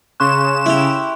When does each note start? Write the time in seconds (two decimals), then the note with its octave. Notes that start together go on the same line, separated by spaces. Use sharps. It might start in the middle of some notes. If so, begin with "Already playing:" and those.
0.20 C#3 C6 C#6 F#6 E7
0.66 E4 G4